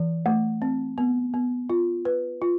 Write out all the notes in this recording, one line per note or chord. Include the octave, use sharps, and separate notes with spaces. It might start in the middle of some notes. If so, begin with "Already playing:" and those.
Already playing: E3
A3
C4
B3
B3
F4
B4
F4